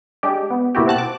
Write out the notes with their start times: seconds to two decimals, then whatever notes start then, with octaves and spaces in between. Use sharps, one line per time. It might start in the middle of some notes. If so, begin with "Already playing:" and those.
0.23 G#3 D4 G4
0.50 B3
0.75 B2 A#3 E4 F#4 G4
0.86 C4 F#4 A5 F#6
0.98 D6